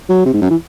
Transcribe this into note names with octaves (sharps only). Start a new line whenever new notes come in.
F#3
C3
G#2
F#2
E3